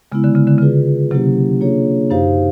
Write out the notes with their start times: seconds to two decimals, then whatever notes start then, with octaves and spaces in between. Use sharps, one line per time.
0.12 C#3 G#3 B3 E4
0.24 D3
0.35 C#3
0.47 D3
0.58 C#3 F4 G#4 B4
1.11 C3 F#3 A#3 C#4 E4 G4
1.61 A#3 D4 F4 G#4 C#5
2.10 F#2 D#4 G4 C5 F5